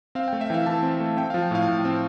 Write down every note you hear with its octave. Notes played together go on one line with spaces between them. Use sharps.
C4 F5
A3 G5
E5
E3 F5 G5
E3 A5
C4
A3
C4 G5
F3 F5
G5
A2 F5
A2
C4